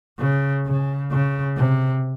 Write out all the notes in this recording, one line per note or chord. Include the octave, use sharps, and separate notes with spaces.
C#3
C#3
C#3
C3